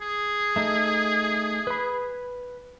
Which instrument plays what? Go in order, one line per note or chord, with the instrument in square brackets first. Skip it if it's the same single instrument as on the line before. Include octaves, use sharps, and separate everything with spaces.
[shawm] G#4
[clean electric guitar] A3 D#4
B4 B5